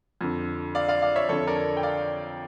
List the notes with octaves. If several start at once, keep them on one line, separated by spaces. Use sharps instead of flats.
F2 D3
D5 F5
D5 F5
D5 F5
C#5 E5
F2 D3 A4 C#5
A#4 D5
G5
D5 F5